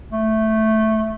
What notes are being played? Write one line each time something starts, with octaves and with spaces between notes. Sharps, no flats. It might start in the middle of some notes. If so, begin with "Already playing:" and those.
A3